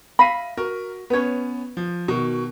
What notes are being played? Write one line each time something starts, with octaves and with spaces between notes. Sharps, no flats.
E5 F5 B5 A#6 B6 D#7
F#4 A#4
B3 C#4 B4 C#5
F3
B2 D#3 F#4